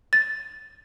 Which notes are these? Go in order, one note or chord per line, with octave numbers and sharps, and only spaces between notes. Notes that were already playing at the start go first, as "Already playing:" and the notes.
A6